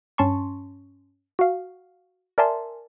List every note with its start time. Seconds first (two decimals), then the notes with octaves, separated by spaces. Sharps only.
0.18 G2 C#4 A5 C6 C#6
1.39 F#4 F5
2.38 A#4 D5 E5 G#5 A5 C6